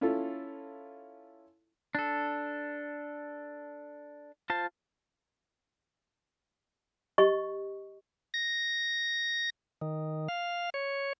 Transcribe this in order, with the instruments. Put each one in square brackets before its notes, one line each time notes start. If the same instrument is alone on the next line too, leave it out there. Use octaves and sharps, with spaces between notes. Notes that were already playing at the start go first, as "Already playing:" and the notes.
[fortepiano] C#4 E4 F4 A4
[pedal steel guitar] D4 A4
F4 C5 A5
[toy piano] G4 D#5 C#6
[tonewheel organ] A#6
D#3
F5
C#5